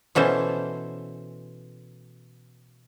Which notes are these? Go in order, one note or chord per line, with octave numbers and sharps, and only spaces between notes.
B2 E3 C#4 A4 C5